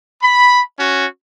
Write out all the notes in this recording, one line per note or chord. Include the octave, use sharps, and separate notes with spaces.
B5
C#4 F#4